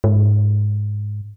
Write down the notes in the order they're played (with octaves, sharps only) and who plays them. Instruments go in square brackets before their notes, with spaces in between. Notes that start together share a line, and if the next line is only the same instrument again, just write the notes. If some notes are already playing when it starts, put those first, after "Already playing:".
[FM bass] G#2